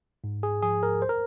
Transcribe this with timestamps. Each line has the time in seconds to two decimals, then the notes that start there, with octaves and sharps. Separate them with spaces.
0.24 G#2
0.43 G#4
0.62 F3 G#4
0.83 A#4
1.02 C5
1.09 A#4